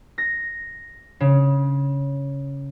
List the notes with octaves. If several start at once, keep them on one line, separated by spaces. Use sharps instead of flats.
A#6
C#3